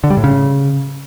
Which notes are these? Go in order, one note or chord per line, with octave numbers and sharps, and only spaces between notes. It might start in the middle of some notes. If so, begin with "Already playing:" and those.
D3
G3
A2
C#3